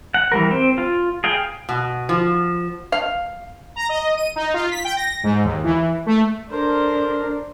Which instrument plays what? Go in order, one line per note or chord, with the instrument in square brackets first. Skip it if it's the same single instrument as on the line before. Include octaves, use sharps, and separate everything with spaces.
[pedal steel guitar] F#5
E3 G3 A#4
C4
F4
G#4 F5 G5
[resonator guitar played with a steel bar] B2
F3
[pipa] F5
[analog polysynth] A#5
D#5
D#7
D#4
F4
B6
G5
A#6
G#2
D#2
E3
A3
[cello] D4 [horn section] A4 A#4 [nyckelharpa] C5